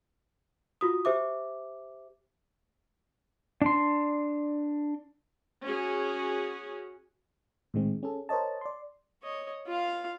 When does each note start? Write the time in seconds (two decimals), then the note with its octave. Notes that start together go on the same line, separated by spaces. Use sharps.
0.81 F4 F#4 D#6
1.05 G4 C5 E5 D6
3.62 D4 C6
5.66 C#4 F#4 G#4
7.74 A2 D#3 G#3 C4
8.03 C#4 G#4 A4
8.29 A#4 C5 C#5 D#5 A5
8.61 D5 C6
9.23 C#5 D#5
9.66 F4 F5